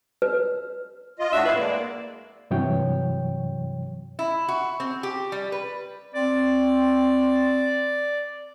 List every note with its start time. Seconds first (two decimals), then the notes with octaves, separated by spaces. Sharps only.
0.22 B4
1.19 F4 D#5
1.33 A2 D4 F#4 E5
1.45 F2 E4 B4 F5
1.57 G#3 A#3 D5
2.51 G2 C3 E3 F#3 C#5 G5
4.19 E4
4.48 F#4
4.80 C4
5.03 G4
5.32 G3
5.52 B4
6.15 C4 D5